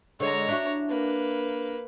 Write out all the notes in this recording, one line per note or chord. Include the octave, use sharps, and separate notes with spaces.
D3 G#3 C#5 A#5
D4 E4 F#4
A#3 B4